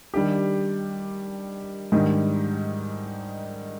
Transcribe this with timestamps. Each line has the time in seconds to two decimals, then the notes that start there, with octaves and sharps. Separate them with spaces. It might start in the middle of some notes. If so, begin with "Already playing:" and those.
0.14 D#3 G3 D4 G4
1.92 G#2 D#3 G3 D4